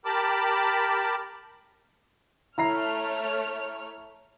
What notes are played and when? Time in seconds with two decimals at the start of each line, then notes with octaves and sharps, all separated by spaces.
0.05 G4 A#4 A5 B5 D6
2.58 A3 E4 C#5 A#5 F6 C7